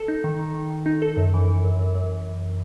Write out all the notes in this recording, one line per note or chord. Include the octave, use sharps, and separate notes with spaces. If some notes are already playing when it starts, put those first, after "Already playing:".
Already playing: A4
D#4
D#3
D#3
D#3
D#3
D#4
A4
F#2
E3
E3
F#2
F#2
F#2